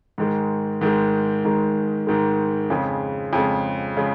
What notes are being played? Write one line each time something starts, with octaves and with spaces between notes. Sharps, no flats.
G#2 D#3 G#3
G#2 D#3 G#3
G#2 D#3 G#3
G#2 D#3 G#3
F2 C#3 G#3
F2 C#3 G#3
C#3 G#3